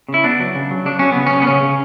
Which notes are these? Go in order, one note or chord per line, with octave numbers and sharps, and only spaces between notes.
C#3
E4
B3 D4
F#3
C#3
F#3
C#3 D4
F#3 C#4
C#3 B3
C#4
C#3
B3
C#3 C#4
C#3